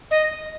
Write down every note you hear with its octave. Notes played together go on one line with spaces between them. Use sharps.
D#5